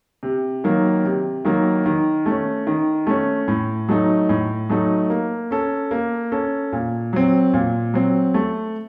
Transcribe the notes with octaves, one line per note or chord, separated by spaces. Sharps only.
C3
D#3 F#3 A#3
C3
D#3 F#3 A#3
D#3
A3 C#4
D#3
A3 C#4
A2
F#3 A3 D#4
A2
F#3 A3 D#4
A#3
C#4 A4
A#3
C#4 A4
A#2
F#3 C4
A#2
F#3 C4
A3